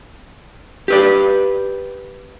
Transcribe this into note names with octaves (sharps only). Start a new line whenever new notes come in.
G4 B4 D5